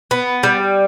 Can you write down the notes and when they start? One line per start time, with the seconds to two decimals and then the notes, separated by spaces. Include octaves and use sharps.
0.11 B3
0.43 G3